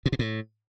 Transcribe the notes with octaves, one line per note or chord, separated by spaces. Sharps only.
A#2
B2
A2